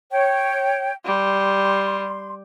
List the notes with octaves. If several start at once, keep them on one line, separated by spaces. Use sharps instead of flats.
C#5 G5
G3 C6